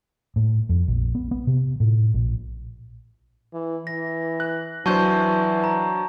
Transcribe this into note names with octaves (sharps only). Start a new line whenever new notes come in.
A2
F2
A#1
B3
B3
C3
A2
A#1
E3
E3 A#6
F#6
E3 F#3 D4 C5 A5 C#6 G6
A#5